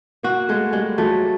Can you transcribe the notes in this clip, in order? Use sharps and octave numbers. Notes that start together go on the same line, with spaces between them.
A#3 F#4
G#3 A3
G3 G#3
F#3 A3